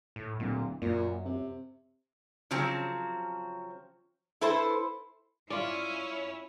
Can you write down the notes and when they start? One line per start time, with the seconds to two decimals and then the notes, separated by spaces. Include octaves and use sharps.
0.16 A2
0.40 D1 A#2
0.82 F#2 A#2
1.25 C3
2.51 C#3 F3 F#3 C4
4.41 E4 A4 B4 C5
5.50 C#4 E4 F4 D5